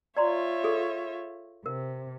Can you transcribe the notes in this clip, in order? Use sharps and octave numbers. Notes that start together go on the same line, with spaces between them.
F4 C#5 D5 E5 A#5 C6
G#4 A4
C3 A#4